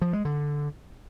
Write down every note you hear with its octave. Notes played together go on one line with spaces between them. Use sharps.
F3
G#3
D3